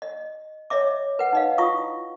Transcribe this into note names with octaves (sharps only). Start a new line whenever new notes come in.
D#5
C#5 D#5 E5 D6
B4 F#5
D#4 D#5 F5
E4 F4 C#6 D#6